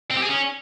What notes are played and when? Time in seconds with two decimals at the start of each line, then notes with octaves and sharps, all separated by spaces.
0.11 C4
0.17 G4
0.23 G#4
0.29 C#4